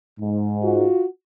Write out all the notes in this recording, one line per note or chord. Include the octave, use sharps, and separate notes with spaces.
G#2
F4 F#4